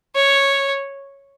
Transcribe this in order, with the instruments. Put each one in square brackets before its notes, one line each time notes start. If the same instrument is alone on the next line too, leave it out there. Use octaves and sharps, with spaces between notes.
[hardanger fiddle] C#5